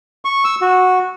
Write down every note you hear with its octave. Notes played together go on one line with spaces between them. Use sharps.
C#6
E6
F#4